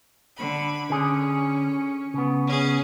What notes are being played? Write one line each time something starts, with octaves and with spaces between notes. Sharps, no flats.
D3 B5
D3 C#4 G#4
C#3 B3
C#4 G#4